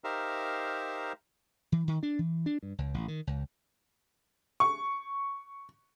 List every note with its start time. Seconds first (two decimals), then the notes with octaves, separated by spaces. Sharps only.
0.04 D#4 G4 A#4 C5 E5 F5
1.72 E3
1.88 D#3
2.03 D4
2.19 E3
2.46 D4
2.63 G2
2.78 C#2
2.94 A1
3.08 D#3
3.27 C#2
4.60 C#6